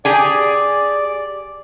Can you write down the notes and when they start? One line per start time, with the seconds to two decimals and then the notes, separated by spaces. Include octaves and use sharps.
0.05 G4 G#4 D5 G#5